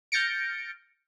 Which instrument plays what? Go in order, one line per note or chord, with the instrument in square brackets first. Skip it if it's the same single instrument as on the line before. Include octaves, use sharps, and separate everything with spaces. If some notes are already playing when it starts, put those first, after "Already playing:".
[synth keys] F6 G6 A6 A#6 C#7 D7